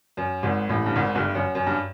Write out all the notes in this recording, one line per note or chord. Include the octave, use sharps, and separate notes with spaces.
F#2
G#1 G#2
A1 A2
G2
G#1 G#2
G1 G2
F#2
F#2
G2